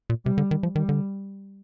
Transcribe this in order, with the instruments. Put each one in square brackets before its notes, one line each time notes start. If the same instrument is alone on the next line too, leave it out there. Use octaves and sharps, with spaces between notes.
[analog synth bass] A#2
[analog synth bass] C3 [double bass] G3
[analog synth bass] D3
D#3
F3
[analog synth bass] D#3 [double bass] G3
[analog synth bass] D3